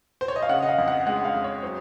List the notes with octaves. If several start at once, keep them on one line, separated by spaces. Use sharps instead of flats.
C5
C#5
D#5
F5
C#3 F#5
D#5
F5
F2
F#5
G#3 F#5
F5
F2
C#5
F#3 C5